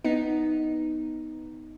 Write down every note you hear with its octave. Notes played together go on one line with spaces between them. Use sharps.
B3 D#4